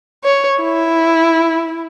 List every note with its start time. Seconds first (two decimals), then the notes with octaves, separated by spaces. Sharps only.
0.24 C#5
0.61 E4